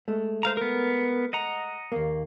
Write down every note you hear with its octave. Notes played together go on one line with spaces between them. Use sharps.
G#3 A3
C5 F5 A#5
B3 A#4
D#5 F#5 A#5
D#2 A#3